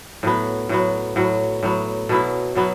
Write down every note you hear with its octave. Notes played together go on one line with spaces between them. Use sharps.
A2 F#3 B3
A2 F#3 B3
A2 F#3 B3
A2 F#3 B3
B2 F#3 B3 E4
B2 F#3 B3 E4